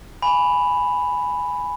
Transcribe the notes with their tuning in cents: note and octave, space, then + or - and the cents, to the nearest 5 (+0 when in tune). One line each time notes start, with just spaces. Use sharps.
G#5 +0 B5 +0